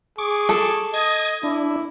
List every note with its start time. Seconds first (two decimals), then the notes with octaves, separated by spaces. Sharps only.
0.18 G#4 C#6 D6
0.49 A4
0.94 D#5 D#6 G#6
1.43 D4 E4